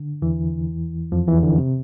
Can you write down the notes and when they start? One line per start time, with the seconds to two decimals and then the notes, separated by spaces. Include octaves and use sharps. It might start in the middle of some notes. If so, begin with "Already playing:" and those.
Already playing: D3
0.22 E2 E3
1.12 F2 F3
1.28 E2 E3
1.43 D3
1.58 C3